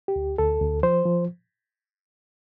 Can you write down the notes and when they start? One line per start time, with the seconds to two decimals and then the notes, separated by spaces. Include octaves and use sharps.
0.08 G4
0.16 D2
0.38 D2 A4
0.61 D2
0.83 F3 C5
1.05 F3